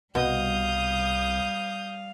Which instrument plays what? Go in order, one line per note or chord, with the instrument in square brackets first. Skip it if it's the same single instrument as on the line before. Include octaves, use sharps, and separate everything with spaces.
[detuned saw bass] C2 [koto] B2 [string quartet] G3 F5 [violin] D#6 G6